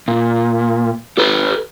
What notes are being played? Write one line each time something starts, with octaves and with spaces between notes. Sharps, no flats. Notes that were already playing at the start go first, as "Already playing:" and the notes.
A#2
G4 A4 B4